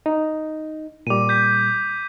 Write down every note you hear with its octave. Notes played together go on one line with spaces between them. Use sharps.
D#4
A#2 G3 D6 D#7
G6 B6